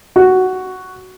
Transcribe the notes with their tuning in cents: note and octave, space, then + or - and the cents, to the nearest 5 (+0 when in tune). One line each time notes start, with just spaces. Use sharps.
F#4 +5